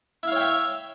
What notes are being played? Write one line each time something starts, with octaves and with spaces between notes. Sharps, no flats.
E4 C#5 E5 F5 G5